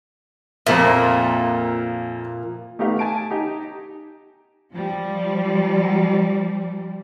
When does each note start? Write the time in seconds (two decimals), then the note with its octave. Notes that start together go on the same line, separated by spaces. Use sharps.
0.66 F2 A#2 F3 A#3 E5
2.79 A3 B3 D#4 G4 F5 F#5
2.99 G#5 A5 D7
3.31 D#4 G4
4.72 F3 G3